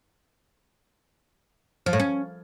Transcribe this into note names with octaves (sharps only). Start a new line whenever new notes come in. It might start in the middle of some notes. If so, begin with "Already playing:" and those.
F3
A2
C#4